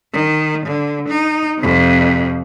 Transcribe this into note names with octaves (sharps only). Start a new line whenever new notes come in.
D#3
D3
D#4
F2 C3